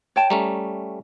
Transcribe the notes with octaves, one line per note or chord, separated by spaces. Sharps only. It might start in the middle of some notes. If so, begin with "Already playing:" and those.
C#5 G5 A5
G3 A3 C#4 A#5